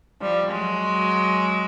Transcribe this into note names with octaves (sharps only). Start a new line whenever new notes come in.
F3 G3
F#3 G#3